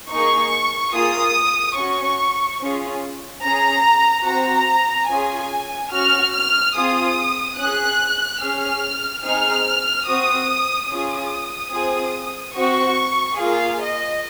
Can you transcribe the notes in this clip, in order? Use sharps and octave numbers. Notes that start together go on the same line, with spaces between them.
A#3 D#4 G#4 C#6
A#3 F4 G#4 D#6
C#4 F#4 C#6
C#4 F4 G#4
C#4 G#4 A#5
C4 F#4 A#5
C#4 F4 G#4 G#5
C#4 F#4 F6
F6
C4 F4 G#4 D#6
C#4 G#4 F#6
C#4 G#4 F6
C4 D#4 G#4 F6
C4 F#4 D#6
C#4 F4 G#4 D#6
C4 F4 G#4
C4 F#4 C#6
A#3 F4 G#4 F5
D#5